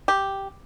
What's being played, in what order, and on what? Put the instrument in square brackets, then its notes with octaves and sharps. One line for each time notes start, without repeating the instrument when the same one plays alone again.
[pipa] G4